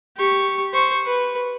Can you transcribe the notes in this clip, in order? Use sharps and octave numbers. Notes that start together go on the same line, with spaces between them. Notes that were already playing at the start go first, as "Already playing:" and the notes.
G4 C#6
C5 C#6
B4